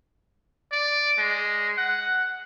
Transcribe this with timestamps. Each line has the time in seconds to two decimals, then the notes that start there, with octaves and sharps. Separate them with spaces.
0.72 D5
1.19 G#3
1.78 F#5